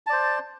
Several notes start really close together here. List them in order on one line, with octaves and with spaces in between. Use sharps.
A5 D5 C5